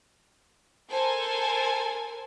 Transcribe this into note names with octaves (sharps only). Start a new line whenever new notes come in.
A4 A#4 C5 G#5